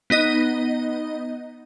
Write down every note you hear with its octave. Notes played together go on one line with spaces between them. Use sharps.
B3 D#4 D#5